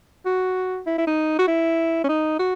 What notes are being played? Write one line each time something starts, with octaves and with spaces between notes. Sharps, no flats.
F#4
E4
E4
D#4
F#4
E4
C#4
D#4
F#4